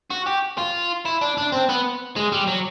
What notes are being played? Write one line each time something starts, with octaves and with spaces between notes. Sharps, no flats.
F#4
G4
F4
E4
D4
D4
C4
B3
G#3
G3
F#3